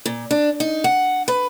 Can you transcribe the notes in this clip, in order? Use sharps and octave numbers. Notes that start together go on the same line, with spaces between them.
A#2
D4
D#4
F#5
B4